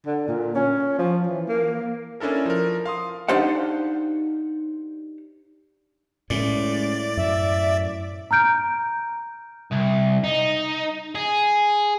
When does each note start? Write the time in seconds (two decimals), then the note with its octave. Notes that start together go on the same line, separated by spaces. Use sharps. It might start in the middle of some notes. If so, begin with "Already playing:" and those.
0.06 D3
0.28 A#2
0.55 C#4
0.99 F3
1.27 E3
1.48 A#3
2.20 C#4 D4 E4 A4 A#4
2.46 F3 A#4
2.86 F5 C6 D#6
3.28 D4 D#4 G4 C5 F5 F#5
6.30 A2 G#3 C#4 D5
7.17 F#2 E5
8.31 A#5 F6 G6 D7
9.72 C2
10.24 D#4
11.15 G#4